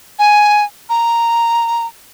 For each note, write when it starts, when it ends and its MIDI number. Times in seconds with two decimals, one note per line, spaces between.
0.19 0.64 80
0.89 1.86 82